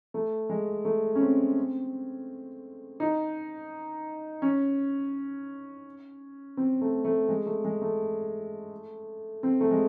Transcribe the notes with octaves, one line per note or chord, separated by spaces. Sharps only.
A3
G#3
A3
C#4
C4
D#4
C#4
C4
A3
A3
G#3
A3
G#3
A3
C4
A3
G#3